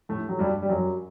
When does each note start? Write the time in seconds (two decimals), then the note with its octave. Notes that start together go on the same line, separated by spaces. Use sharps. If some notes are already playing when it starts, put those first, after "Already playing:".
0.09 A2 A3
0.29 F#3
0.39 G2 G3
0.62 G3
0.69 F#2 F#3